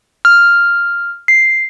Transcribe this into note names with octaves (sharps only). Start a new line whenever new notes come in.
F6
C7